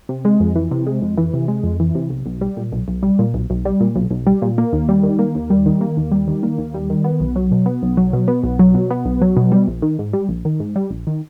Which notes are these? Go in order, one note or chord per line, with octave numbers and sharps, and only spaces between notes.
C3
G#3
F2
E3
C3
G#3
F2
E3
C3
G#3
F2
E3
C3
B1
B1
G3
A#2
B1
B1
G3
A#2
B1
B1
G3
A#2
B1
B1
G3
A#2
A#3
D#2
G3
D#3
A#3
D#2
G3
D#3
A#3
D#2
G3
D#3
A#3
D#2
G3
D#3
B3
B1
F#3
B2
B3
B1
F#3
B2
B3
B1
F#3
B2
B3
B1
F#3
B2
G3
A#1
D#3
G#2
G3
A#1
D#3
G#2
G3
A#1
D#3